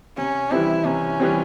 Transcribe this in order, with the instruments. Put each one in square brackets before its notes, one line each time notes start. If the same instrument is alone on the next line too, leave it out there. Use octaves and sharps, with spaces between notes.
[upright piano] C3 [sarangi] C#4
[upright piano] E3 G3 C4 [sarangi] E4
[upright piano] C3 [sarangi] C#4
[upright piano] E3 G3 C4